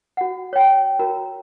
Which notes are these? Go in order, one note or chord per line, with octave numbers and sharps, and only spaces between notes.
F#4 F#5
C#5 G5
F#4 A#4 A#5